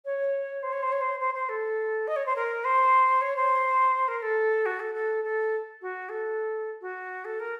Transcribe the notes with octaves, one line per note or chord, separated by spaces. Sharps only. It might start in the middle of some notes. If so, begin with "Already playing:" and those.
C#5
C5
C#5
C5
C#5
C5
C5
C5
A4
D#5
C#5
C5
A#4
C5
C#5
C5
A#4
A4
F#4
A4
A4
A4
F#4
A4
F#4
A4
A#4